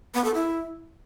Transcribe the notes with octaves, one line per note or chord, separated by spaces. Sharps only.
B3
A4
E4